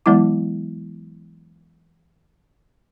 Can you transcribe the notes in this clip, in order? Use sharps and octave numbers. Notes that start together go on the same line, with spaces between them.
E3 F#3 G#3 B3 E4 D6